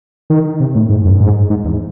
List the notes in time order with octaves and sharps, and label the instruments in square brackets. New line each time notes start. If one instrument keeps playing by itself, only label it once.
[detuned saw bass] D#3
C3
A2
G#2
F#2
G#2
G#2
E2